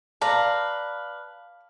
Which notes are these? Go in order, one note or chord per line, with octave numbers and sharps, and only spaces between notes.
B4 D5 F5 A5 A#5